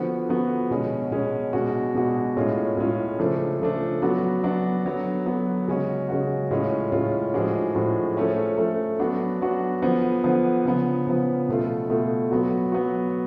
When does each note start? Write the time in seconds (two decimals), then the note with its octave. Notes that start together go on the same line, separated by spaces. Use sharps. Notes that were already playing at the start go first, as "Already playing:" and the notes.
Already playing: D3 F3 B3 F#4
0.29 D3 F3 B3 F#4
0.70 B2 G#3 C#4
1.11 B2 G#3 C#4
1.53 B2 G#3 D4 F#4
1.95 B2 G#3 D4 F#4
2.37 A2 G#3 C#4 F4
2.77 A2 G#3 C#4 F4
3.19 C#3 F3 A3 D4
3.60 C#3 F3 A3 D4
4.02 F#3 B3 D4 F#4
4.43 F#3 B3 D4 F#4
4.85 D3 F#3 B3
5.26 D3 F#3 B3
5.68 C#3 G#3 C#4 F#4
6.09 C#3 G#3 C#4 F#4
6.51 A2 G#3 C#4 F4
6.92 A2 G#3 C#4 F4
7.34 A2 F3 G#3 D4 F#4
7.75 A2 F3 G#3 D4 F#4
8.17 F3 A3 C#4
8.58 F3 A3 C#4
8.99 F#3 B3 D4 F#4
9.41 F#3 B3 D4 F#4
9.82 D3 F3 B3
10.24 D3 F3 B3
10.65 C#3 F3 B3
11.07 C#3 F3 B3
11.48 B2 A3 F4
11.90 B2 A3 F4
12.31 F#3 B3 F#4
12.72 F#3 B3 F#4